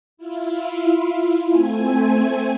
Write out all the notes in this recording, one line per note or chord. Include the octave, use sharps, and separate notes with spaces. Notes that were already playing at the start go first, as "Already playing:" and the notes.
E4 F4
A3 C4 G#5